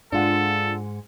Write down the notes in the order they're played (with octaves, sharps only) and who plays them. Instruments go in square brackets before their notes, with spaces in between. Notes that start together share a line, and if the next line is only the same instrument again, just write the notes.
[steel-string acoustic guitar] G#2 G#3 F#5 [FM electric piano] D4 F4 [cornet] A4